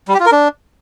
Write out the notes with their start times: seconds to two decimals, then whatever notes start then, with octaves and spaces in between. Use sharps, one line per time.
0.08 G3
0.14 G4
0.20 F4
0.26 A#4
0.32 D4